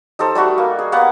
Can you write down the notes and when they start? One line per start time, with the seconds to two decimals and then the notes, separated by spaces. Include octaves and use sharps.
0.19 D#4 G4 A4 C5
0.35 G3 A3 F#4 C#6
0.58 A#3
0.79 G#4
0.92 A#3 B3 G4 F#5